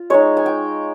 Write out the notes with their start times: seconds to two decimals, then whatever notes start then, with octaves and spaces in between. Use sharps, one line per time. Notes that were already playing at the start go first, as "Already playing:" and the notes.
Already playing: F4
0.10 G#3 D#4 C#5
0.37 G#5
0.46 G5